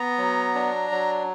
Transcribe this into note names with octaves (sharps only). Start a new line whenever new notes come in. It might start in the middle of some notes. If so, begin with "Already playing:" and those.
Already playing: B3 A#5
F#3
D4
F#3